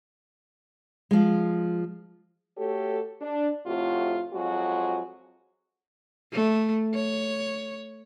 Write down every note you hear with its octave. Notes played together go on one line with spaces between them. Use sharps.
F3 G#3
A3 F#4 G4 A4 C#5
D4
F2 A2 C3 F4 F#4
F2 F3 F#3 G#3 F#4
A3
C#5